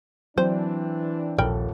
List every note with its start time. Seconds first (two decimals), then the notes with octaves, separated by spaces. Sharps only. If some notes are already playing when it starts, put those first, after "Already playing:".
0.38 E3 F#3 C4 D4 C5
1.38 D#1 A#1 A4 A#4 G5 B5